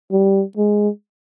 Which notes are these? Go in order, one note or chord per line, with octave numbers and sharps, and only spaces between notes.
G3
G#3